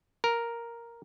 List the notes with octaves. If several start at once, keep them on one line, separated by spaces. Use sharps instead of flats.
A#4